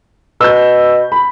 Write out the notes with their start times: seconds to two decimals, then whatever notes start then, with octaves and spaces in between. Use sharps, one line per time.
0.41 B2 E6 G6
1.12 B5